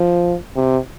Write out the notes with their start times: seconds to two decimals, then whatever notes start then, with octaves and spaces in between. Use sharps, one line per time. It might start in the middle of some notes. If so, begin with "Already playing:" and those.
Already playing: F3
0.56 C3